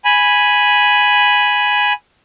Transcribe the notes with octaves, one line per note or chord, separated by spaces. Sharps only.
G#5 B5